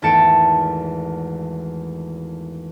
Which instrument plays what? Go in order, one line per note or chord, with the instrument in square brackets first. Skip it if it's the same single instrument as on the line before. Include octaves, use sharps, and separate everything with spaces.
[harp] G#1 E2 A3 A5 C#7 D7